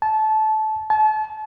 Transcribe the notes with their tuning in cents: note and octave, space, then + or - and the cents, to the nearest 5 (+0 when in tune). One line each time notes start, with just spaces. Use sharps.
A5 -20
A5 -35